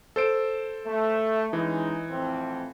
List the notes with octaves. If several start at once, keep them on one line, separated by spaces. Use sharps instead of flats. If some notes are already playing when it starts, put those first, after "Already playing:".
A4 C5 D7
A3
E3 G#3 C#4 D#4
F2 A2 C4